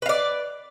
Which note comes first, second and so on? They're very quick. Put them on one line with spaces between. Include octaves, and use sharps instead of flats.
B4 F5 D5